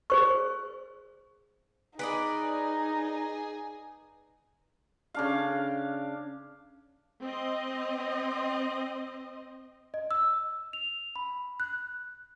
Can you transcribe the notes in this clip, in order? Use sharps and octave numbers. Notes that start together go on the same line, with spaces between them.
G#4 C5 C#6
D#4 G#4 B4 D5 D#5
C#3 D4 F5
C4 D#5
D#5
E6
F7
B5
F#6